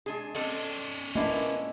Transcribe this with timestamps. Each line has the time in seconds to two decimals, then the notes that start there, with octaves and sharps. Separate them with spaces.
0.06 G#3 D4 G#4
0.35 C4 C#4 A4 D5 D#5
1.15 G#3 A#3 B3 D4 E4